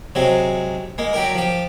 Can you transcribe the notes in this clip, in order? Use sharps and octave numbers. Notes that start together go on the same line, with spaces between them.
C3 F#3 G#3 C4
G#3 A#3
F#3 G4 A#4
F3 G4